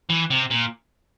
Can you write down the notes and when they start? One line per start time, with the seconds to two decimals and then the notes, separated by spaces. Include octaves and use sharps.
0.10 E3
0.31 C3
0.50 A#2